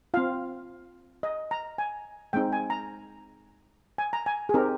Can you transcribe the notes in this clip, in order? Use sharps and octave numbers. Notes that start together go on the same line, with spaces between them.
C4 F4 F5
D#5
A#5
G#5
G#3 C4 D#4 G5
G#5
A#5
G#5
A#5
G#5
G#4
C4 D#4 G4 A#4